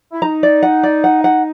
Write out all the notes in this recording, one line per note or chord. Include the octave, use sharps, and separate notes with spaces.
E4
D#4 A#5
D5
F#5
D5
F#5
F#5